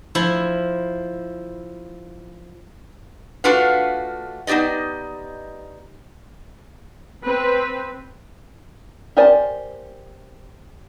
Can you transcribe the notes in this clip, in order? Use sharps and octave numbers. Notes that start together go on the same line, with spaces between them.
F3 E4
A3 D4 F4 F#4 B4 F5
B3 D#4 G4 D5 D#5
C4 B4
G4 A#4 C5 D5 G#5